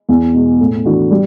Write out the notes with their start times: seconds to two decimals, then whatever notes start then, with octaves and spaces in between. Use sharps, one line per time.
0.09 E2
0.34 B2 G#3
0.60 A2
0.85 E3 A3 D4 F#4
1.11 G3